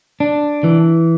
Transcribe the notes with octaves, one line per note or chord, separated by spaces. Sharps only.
D4
E3